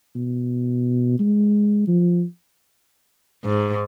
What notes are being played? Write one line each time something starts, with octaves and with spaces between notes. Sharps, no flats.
B2
G#3
F3
G#2